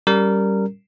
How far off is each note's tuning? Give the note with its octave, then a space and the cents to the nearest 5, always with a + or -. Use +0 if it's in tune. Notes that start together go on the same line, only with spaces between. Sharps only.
G3 -5 C#4 +0 A#4 -15